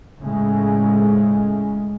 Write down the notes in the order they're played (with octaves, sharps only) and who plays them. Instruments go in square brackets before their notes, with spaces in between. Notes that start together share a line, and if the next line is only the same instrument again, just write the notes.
[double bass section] A2 C#3 G#3